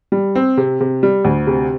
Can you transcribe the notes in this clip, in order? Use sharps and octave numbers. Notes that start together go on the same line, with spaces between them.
G3
C4
C3
C3
G3
D2
C3